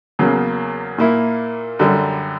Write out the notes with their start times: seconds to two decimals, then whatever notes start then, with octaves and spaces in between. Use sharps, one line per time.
0.19 E2 C#3 F#3 A#3
0.98 A#2 A#3 E4
1.79 F#2 D3 G3